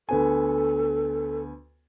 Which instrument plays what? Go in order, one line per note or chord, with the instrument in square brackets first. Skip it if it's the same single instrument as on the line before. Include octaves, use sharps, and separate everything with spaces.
[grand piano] D2 B3 G#5 [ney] A4